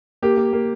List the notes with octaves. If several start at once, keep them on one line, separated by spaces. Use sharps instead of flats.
A#3 G4
A#3
A#3